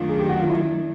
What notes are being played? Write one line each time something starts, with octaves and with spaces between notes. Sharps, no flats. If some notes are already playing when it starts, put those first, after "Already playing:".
Already playing: F#2 D#3 F#3 A3 D4 F4
G#4
G4
F#4
F4
E4